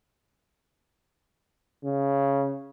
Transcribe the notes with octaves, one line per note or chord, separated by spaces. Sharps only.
C#3